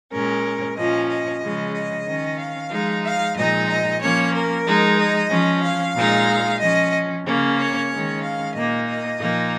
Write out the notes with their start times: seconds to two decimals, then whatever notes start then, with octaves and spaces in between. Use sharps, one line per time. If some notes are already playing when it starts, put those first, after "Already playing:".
0.11 A#2 G#3 C#4 A#4
0.76 A#2 F3 C#4 D#5
1.08 D#5
1.41 C#3 F3 G#3 C#4
1.73 D#5
2.06 D#3 C#4
2.38 F5
2.70 F3 G#3 D#4
3.03 F5
3.35 A#2 F3 G#3 D#4 D#5
3.67 D#5
4.00 F3 A#3 C#4 C#5
4.32 A#4
4.65 F3 G#3 D#4
4.98 D#5
5.30 F3 C#4
5.62 F5
5.94 A#2 G#3 D#4
6.59 F3 C#4 D#5
7.24 C#3 A#3 C#4
7.57 C#5
7.89 D#3 G#3 C#4
8.22 F5
8.54 A#2 A#3 D#4 D#5
8.87 D#5
9.18 A#2 F3 A#3 D#4